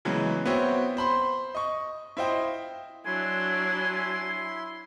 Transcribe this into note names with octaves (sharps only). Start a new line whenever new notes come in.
C#3 E3 F#3 G#3 B3
B3 C4 F#4 C#5 E5 G5
C5 B5 C6
D#5 C#6
E4 F4 C5 D#5 G5
F#3 D4 E4 G#5 C6